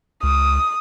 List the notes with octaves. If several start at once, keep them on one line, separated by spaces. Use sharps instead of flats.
C#2 D#6